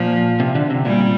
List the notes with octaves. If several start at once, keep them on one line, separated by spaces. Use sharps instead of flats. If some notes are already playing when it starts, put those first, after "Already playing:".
Already playing: A#2 F3
C3
D3
C3
A#2 G3